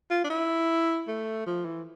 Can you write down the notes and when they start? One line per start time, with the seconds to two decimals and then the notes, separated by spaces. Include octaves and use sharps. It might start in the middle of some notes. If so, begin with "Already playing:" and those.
0.10 F4
0.24 D4
0.30 E4
1.08 A3
1.47 F3
1.65 E3